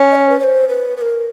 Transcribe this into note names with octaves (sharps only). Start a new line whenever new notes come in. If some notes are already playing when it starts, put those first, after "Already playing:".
Already playing: C#4
D#5
C#5
B4
C#5
C5
B4
B4
A#4